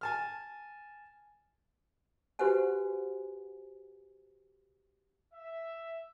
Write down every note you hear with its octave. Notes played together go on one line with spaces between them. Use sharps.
G#5 A5 F6
F#4 G4 B4 C5 F#5 G#5
E5